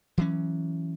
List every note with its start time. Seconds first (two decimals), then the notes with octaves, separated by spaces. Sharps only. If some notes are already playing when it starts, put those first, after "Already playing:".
0.18 E3 F#3 C#4